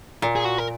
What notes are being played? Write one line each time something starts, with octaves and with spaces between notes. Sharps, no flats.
A#2
G#4
F#4
A#4